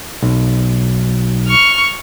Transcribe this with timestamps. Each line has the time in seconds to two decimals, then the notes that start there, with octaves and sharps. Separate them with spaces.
0.22 B1
1.48 C#6 F6